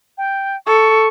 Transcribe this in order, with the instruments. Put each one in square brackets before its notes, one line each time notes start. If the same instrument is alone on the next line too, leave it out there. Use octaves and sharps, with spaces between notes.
[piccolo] G5
[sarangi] A4 [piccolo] C#6